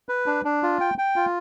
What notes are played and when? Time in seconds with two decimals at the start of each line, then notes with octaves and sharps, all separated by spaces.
0.09 B4
0.26 D4
0.45 D4
0.63 F4
0.80 G5
0.98 G5
1.16 F4